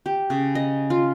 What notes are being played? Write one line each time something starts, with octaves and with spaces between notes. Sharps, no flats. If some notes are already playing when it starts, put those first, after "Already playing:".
G4
C#3
D#5
F4